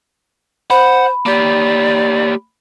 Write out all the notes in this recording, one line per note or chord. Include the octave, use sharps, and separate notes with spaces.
C5 F#5 B5
A#3 G4 D5